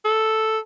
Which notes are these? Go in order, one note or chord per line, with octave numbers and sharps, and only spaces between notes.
A4